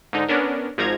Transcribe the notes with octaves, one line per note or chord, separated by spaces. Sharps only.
G#2 D3 D#4
B3 C#4 D4 A#4
G#1 G#2 F3 A#5 G#6